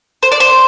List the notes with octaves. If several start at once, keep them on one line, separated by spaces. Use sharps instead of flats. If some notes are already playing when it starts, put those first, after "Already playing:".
C5
D5
C5